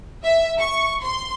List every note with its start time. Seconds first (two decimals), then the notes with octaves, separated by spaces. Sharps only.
0.24 E5
0.59 C#6
1.03 C6